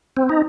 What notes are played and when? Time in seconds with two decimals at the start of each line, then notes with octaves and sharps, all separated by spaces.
0.17 C4
0.29 D#4